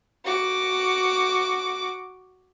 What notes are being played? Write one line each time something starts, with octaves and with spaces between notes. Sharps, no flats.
F#4 D6